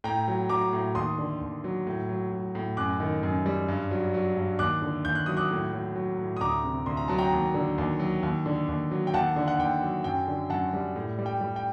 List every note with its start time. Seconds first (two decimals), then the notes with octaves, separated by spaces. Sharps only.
0.04 A2 G5 A#5
0.28 F#3
0.49 F#3 A#5 D6
0.73 A2
0.95 D#2 C6 D#6
1.18 D3
1.41 D#2
1.64 F#3
1.87 A2
2.09 F#3
2.32 F#3
2.55 A2
2.77 F#2 D6 F#6
3.00 D#3
3.23 F#2
3.46 G3
3.69 G2
3.91 F#3
4.14 F#3
4.37 G2
4.59 D#2 D6 F#6
4.82 D3
5.05 D#2 G6
5.15 F#6
5.26 F#3 D#6
5.37 D6 F#6
5.50 A2
5.73 F#3
5.96 F#3
6.19 A2
6.37 D#6
6.41 D2 A#5 D6
6.64 C3
6.86 D2 C6
6.97 A#5
7.08 F#3 A5
7.18 G5 A#5
7.32 D#2
7.54 D3
7.78 D#2
8.00 F#3
8.23 D#2
8.46 D3
8.68 D#2
8.91 F#3
9.07 G5
9.13 D#2 F#5 A5
9.36 D3
9.48 F#5
9.59 D#2 G5
9.82 F#3
10.04 F#2 G5
10.28 D3
10.50 F#2 F#5 A5
10.73 G3
10.96 A2
11.19 G3
11.26 G5
11.41 G3
11.56 G5